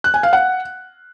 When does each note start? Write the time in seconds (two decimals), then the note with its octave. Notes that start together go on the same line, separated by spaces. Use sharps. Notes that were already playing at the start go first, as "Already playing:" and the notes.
0.04 F#6
0.14 G#5
0.23 F5
0.33 F#5